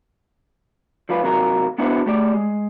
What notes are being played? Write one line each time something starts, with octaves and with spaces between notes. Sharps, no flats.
F3 G3 F4 B4
D#2 C3 F#3 F4 A#4
B3 D4 E4 F#4 B4 C5
A3 G4 D5
G#3